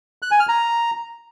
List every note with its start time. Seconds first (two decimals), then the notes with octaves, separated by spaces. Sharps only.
0.22 F#6
0.31 G#5
0.40 F6
0.49 A#5